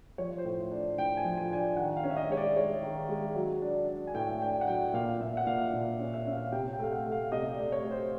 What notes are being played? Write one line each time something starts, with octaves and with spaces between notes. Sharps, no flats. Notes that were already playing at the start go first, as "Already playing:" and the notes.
F3 C#5
C5
A2
D4
A2 G5
G#5
F3
G#5
D4 G#5
G5
D#3 F#5
F5
C#4
E5
D#5
G#3 C#5
D5
G#3 C#5
D#3
G#3
F#3
D4
D4
G#5
A2 G5
D4 G5
F#5
F#3 G5
A#2 F5
A#2 E5
F#5
A#2 F5
A#2
C#4
E5
C#4
F5
C3 G5
G5
A3 F5
F#5
A3
F5
C3 D#5
D5
A3
C#5
A3
C5